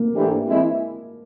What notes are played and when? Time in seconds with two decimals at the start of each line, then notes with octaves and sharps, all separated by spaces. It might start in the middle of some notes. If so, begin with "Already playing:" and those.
Already playing: A#3
0.14 G#2 E3 A3 D4 G4
0.47 E3 G#3 C4 E4